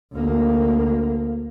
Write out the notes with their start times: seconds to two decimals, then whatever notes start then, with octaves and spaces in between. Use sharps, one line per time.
0.13 D2 A#3